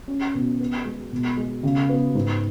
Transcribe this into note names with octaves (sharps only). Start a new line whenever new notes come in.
C#4
B2
B3
G#3
B2
G#3
C#3
B3
G#2